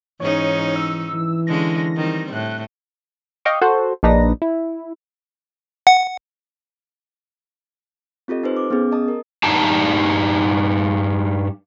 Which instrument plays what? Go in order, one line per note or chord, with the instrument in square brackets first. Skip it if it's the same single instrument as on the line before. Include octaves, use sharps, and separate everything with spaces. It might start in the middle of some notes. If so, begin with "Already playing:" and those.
[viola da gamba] G#2 C#4 D#4 [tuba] E3 [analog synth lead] C#5
[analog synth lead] E6
[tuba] E3
[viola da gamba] D3 G#3 C#4 [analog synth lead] A#6
[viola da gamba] D#3 G3 C4
[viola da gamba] A2 [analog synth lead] F#6
[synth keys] D#5 F5 G5 C#6 D6
F#4 A4 C5
A#1 D4 D#4 B4 A#6
E4
[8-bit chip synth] F#5
[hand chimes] C4 F4 G4 A4 D#5
D#4 A4 B4 C5
D6
B3 C#4 G#4
D#5 A5 D#6
A#4
[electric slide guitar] G2 G3 D#4 G4 G5 A5